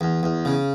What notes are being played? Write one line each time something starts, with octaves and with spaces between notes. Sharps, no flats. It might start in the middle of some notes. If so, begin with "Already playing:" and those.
E2
E2
C#3